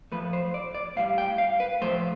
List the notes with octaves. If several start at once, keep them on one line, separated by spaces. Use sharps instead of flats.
A2 F3 A3 B4
C5
D5
D5
A2 G3 F5
G5
F5
B4
A2 F3 A3 C5